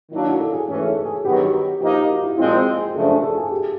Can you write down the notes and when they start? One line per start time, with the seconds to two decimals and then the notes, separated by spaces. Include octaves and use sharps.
0.11 D#3 F#3 A#3 D4 E4 F#4
0.26 E4
0.40 A4
0.53 G#4
0.68 G#2 E3 A3 C#4 G#4
0.87 A4
1.05 G#4
1.25 G2 D#3 F#3 B3 G4
1.81 F3 A#3 D#4 G4
2.10 F#4
2.23 E4
2.38 A#2 F3 G#3 C4 F4
2.57 G#4
2.76 G#4
2.94 F#2 C#3 F3 A3 D4 A4
3.09 G#4
3.22 A4
3.37 G#4
3.51 G4